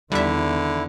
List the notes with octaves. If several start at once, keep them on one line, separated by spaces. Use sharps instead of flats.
E2 D3 D#3 G3 E4 E5